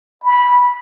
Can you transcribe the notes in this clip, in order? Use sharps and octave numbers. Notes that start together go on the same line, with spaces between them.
B5